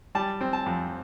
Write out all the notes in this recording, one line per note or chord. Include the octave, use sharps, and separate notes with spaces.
G3 A5
C4
A5
F2